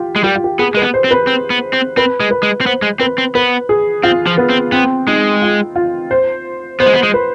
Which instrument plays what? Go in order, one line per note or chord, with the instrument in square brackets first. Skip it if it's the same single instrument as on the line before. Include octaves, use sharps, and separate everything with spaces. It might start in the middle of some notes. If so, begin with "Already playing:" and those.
Already playing: [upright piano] F4 G4
[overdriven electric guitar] G#3
[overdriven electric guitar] G3 [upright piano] G4
[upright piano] F4
G4
[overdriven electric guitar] B3 [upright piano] G#4
[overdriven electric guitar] G#3 [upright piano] B4
[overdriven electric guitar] B3
[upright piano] C5
[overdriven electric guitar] C4
[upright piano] B4
[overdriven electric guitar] C4
B3
C4
[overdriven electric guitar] C4 [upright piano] B4
[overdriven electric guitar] G#3
[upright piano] B4
[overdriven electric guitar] G#3
C4
[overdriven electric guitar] B3 [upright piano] C5
[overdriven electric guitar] G#3
[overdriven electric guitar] C4 [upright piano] B4
[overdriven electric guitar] C4
[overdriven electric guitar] B3 [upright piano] B4
[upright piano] G#4
[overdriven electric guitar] C4 [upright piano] F4
[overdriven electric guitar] F3
[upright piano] B3
[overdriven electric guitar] C4
[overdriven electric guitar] B3 [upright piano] C4
[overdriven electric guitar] G#3 [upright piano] D#4
[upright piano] F4
F4
C5
[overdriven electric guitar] B3 [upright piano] C5
[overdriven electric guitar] G#3
B3
G#3
[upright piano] B4